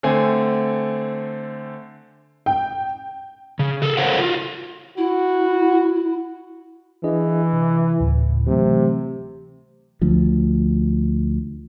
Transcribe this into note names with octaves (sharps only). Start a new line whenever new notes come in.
D3 A3 C4 G#5
G5
C#3
G#4 A4
A4 A#4 C5 C#5 F5 F#5
F4 F#4
E4 F#4
E3 D4 G#4 D#5
C3
D2 A2 C#3
C3 E3 F#3 A3
D2 F3